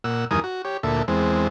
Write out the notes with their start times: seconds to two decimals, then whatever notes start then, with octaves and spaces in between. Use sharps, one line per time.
0.04 A#2 F#5 E6
0.31 E2 G2 D#3 A#4 G#5 D#6
0.44 F#4
0.65 G4 C#5
0.83 D2 A#2 A4 E5
1.08 E2 G#3 C4